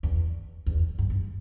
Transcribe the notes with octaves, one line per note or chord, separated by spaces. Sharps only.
E2
E2
G2
G2